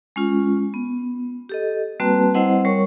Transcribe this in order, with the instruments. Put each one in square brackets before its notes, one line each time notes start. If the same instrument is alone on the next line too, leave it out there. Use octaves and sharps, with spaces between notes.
[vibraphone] G#3 C#4 F4
B3
G4 A4 D#5
G3 A#3 C4 F#4 B4 A5
G3 C4 E4 C5 D#5 F#5
G3 A#4 C#5 C#6